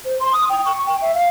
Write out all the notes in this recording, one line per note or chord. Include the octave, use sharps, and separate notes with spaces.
C5
C6
D#6
G5
C#6
G5
E5
F5